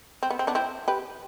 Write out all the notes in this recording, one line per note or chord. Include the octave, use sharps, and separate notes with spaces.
C4
B3
C4
B3 D4
C4 E4
G4 B4